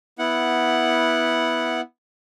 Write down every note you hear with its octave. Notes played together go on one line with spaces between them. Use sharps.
B3 E4 F#5